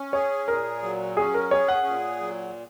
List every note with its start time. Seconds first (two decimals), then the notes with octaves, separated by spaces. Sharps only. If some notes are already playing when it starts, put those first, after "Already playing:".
Already playing: C#4
0.13 G#4 C#5
0.47 A#2 A#4
0.82 F#3
1.17 C#4 G#4
1.34 A#4
1.51 G#4 C#5
1.68 F#5
1.86 A#2
2.20 F#3